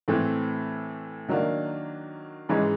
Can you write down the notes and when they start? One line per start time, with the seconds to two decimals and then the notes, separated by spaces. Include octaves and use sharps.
0.08 A2 E3 A3 C4
1.28 D#3 F#3 A#3 D4
2.49 G#2 E3 G#3 C#4